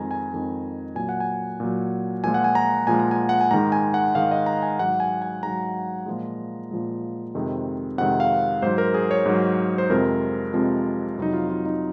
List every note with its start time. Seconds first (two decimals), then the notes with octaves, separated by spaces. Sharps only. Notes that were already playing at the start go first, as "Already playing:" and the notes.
Already playing: F2 D#3 G#3 G#5 A#5
0.11 G#5
0.32 F2 D#3 G#3
0.95 A#2 F#3 G#5
1.09 F#5
1.20 G#5
1.60 A#2 F#3
2.24 A#2 F3 G#3 G#5
2.34 F#5
2.44 G#5
2.55 A#5
2.87 A#2 F3 G#3 G#5
2.99 A#5
3.11 G#5
3.29 F#5
3.41 G#5
3.51 G#2 D#3 G#3 A#5
3.72 G#5
3.94 F#5
4.15 G#2 D#3 G#3 F5
4.31 D#5
4.46 A#5
4.62 G#5
4.79 G#2 F#3 F#5
5.00 G#5
5.22 G#5
5.43 G#2 F#3 A#5
6.06 A#2 F3 G#3
6.71 A#2 F3 G#3
7.35 F2 C3 D#3 G#3
7.98 F2 C3 D#3 G#3 F#5
8.20 F5
8.62 G#2 F#3 C5
8.78 A#4
8.94 G#4
9.11 C#5
9.26 G#2 F#3
9.78 C5
9.89 F2 C3 F3 G#3 A#4
10.54 F2 C3 F3 G#3
11.18 F2 C3 F#3 D#4
11.33 F4
11.50 F4
11.66 D#4